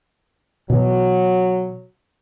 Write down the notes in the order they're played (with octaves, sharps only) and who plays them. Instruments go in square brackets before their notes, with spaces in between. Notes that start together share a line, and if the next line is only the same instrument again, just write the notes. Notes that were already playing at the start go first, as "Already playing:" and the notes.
[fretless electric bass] B2 E3 [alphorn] F#3